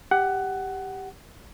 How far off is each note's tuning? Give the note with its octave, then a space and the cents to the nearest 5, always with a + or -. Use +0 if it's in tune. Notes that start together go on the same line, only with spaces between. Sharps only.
G4 +5 F#5 +15